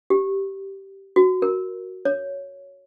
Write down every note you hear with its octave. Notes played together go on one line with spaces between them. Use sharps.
G4
F#4
A#4
C#5